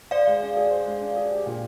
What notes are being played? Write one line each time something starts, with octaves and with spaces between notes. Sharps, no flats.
C5 D5 F5
G#3
D4
G#4
C5
G#3
D4
G#4
G4
A#2